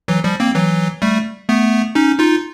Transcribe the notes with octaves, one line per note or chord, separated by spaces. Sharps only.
E3 F#3
F3 G3
A#3 C4
E3 F#3
G3 A3
A3 B3
C#4 D#4
D#4 F4